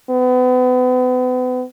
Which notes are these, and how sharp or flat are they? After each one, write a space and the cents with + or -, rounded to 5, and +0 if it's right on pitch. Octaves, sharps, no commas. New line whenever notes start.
B3 +35